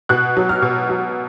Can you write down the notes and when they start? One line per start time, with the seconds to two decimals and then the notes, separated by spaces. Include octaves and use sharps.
0.09 B2 F#6
0.37 F#3
0.49 F6
0.62 B2
0.89 F#3